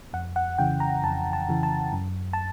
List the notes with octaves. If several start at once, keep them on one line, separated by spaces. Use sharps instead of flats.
F2 F#5
F#5
C#3 E3 G5
A#5
F2 A5
A5
C#3 E3
A5
F#2
A5